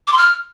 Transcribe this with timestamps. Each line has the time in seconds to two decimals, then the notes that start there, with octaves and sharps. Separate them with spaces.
0.07 D6
0.12 C6
0.17 F6